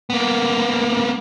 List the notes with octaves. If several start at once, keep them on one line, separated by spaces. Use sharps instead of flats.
A#3 B3